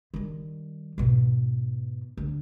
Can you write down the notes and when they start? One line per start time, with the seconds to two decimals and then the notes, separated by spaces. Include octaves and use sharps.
0.14 D#3 G3
0.98 G#2 B2
2.17 D2